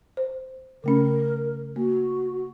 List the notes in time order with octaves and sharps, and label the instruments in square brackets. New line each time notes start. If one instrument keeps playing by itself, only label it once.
[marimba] C5
[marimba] C#3 A3 C#4 [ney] A#4
[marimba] A#3 [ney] F#4